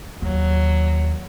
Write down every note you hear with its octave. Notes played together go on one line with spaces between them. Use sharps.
D#2 F#3